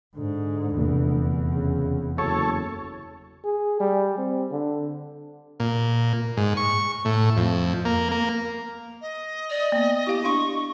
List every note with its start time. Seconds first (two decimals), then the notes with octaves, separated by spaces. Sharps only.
0.16 G#2 D3
0.78 F1 E2
1.54 C#3
2.18 F#1 A4 C#5 C#6
3.44 G#4
3.80 G3
4.18 C4
4.51 D3
5.60 A#2
6.37 G#2
6.57 C#6
7.05 A2
7.37 F2
7.85 A#3
8.11 A#3
9.01 D#5
9.50 D5
9.72 A#3 B3
10.07 E4 G4 F5
10.24 D4 F5 C6 C#6